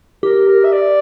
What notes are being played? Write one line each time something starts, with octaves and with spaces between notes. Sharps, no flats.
G4 A#4
A#4
E5
D5